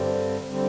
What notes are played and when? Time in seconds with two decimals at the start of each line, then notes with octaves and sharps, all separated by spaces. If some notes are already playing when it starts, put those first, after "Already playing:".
Already playing: G2 D3 G3 C4
0.49 D3 G3 C4